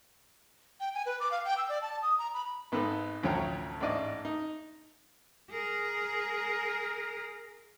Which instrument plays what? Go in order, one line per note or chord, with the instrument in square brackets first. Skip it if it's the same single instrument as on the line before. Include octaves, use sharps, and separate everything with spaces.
[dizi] G5
G#5
B4
D6
F5
G5
E6
D5
A5
D#6
A#5
B5
[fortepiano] G#1 B3 D#4 A4 B4
A1 D2 F3 C#5 G5 A#5
A1 G#2 D4 D5 D#5
D#4
[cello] G#4 A#4